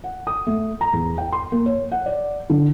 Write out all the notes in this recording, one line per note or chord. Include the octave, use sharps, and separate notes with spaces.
F#5
D#6
A3
A#5
E2
G5
C6
A#3
C#5
F#5
D5
D3